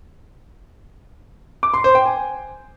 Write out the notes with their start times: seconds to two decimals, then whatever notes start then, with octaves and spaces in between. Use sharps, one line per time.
1.63 D6
1.74 C6
1.84 C5
1.95 G5
2.06 G#5